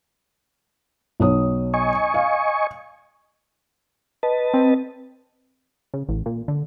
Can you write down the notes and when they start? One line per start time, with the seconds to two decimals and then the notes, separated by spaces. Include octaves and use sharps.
1.20 B1 C#5 D#6
1.74 D#5 G#5 C#6
2.14 F5
4.23 B4 D#5 A5
4.54 C4
5.94 C#3
6.09 A1
6.26 A#2
6.48 D3